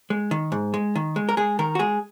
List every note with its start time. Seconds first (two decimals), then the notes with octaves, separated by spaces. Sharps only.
0.10 G#3
0.31 D#3
0.52 G#2
0.74 G#3
0.95 D#3
1.16 G#3
1.29 A#4
1.37 G#3 G#4
1.59 D#3 A#4
1.75 F#4
1.79 G#3 G#4